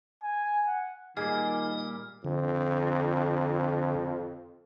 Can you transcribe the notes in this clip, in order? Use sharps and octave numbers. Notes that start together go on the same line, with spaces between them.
G#5
F#5
A#2 D#3 G3 A#3 G#4 D#5
F2 D3